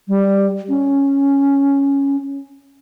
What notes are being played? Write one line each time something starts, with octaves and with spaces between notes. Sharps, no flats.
G3
C#4